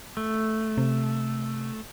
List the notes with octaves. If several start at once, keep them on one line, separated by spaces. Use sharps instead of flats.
A3
C3